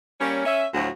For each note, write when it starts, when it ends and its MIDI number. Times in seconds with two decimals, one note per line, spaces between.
0.20 0.43 55
0.20 0.43 58
0.20 0.43 61
0.45 0.66 61
0.45 0.66 76
0.74 0.90 38
0.74 0.90 45
0.74 0.90 53
0.74 0.90 54
0.74 0.90 66